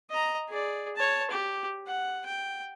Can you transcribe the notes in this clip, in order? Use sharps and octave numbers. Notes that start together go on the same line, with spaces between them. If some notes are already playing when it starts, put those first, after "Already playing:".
D#5 A#5
G#4 D5
C#5 A5
G4
F#5
G5